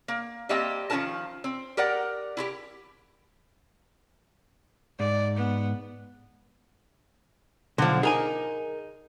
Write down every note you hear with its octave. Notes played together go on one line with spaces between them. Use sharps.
A#3
G3 A#3 C4 G4 D#5 E5
D#3 F3 C#4 E4 A#4 A5
C4
G4 A#4 D5 F#5
E4 F#4 G4
G#2 D5
B3
B1 D3 F3
D#4 G#4 A#4 G#5